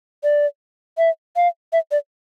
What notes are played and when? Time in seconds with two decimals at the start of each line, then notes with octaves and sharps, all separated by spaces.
0.23 D5
0.98 E5
1.36 F5
1.73 E5
1.91 D5